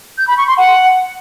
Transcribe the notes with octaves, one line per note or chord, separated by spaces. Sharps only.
G6
B5
C#6
C6
F#5